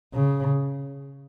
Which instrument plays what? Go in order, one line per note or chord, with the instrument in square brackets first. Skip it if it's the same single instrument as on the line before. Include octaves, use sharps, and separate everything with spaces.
[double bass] C#3